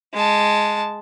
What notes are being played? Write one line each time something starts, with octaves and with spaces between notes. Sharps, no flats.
G#3 A5